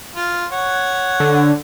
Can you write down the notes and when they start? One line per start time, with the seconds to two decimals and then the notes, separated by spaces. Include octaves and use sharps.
0.16 F4
0.52 C#5 F#5
1.20 D3